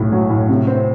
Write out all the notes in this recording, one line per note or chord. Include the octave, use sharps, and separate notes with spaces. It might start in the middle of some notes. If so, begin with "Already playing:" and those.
Already playing: B1 A2
F#3
A2
C3
C4